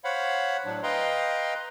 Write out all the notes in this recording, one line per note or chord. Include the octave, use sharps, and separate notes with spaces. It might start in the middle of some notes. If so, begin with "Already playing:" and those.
C5 C#5 F5 F#5 B5
A2 F#3 D4
B4 D#5 F5 G5 A#5 C6